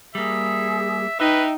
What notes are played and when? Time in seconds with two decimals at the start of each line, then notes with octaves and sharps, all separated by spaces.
0.15 G3 A#3 G#4 E5
1.20 D#4 B4 D#5 E5 G5